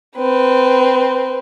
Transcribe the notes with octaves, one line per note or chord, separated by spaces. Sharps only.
C4 B4